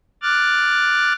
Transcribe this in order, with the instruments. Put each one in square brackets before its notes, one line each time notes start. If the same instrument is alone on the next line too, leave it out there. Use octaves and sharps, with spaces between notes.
[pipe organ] D6 F6 F#6 A6